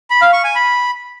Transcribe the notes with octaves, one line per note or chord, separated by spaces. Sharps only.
B5
F5
C#6
G#5
B5